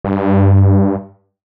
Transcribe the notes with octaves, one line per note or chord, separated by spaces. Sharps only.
G2